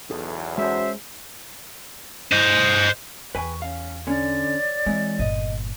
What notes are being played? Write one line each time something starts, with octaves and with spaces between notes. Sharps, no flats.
B1 E2 G#4 A4
G#3 C#4 F#4 C5 E5 A5
C5 D#5
E2 B4 G5 G#5 C#6
C#4 F5
D3 C#4 C#5 D5
E3 G#3 C4
G1 A#2 D#5